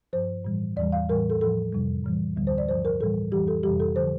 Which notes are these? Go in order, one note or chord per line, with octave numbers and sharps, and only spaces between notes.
G2 F3 C5
A2 E3 G3
E2 E3 G3 D5
F5
A2 E3 G3 A#4
A4
A2 F3 A4
F2 C3 G3
A2 E3 G3
D2 D3 G3
C5
D5
G2 F3 C5
A#4
A2 E3 G3 A4
F2 E3 G3 G4
A4
F2 C3 E3 G3 G4
A4
D3 F3 C5